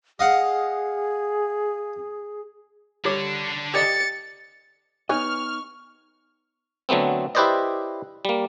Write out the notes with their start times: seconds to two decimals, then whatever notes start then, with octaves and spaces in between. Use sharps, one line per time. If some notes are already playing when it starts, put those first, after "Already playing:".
0.19 G#4 D#5 F5 F#5
3.05 D3 G3 D4 C#5 D6
3.74 G4 D5 D#5 A6 C#7
5.09 B3 D#4 B4 C#5 D#5 G#5 C#6 F6
6.89 D3 F#3 A3 B3 C4
7.35 E4 G4 B4 C5 D5 D#5
8.25 G3 A#3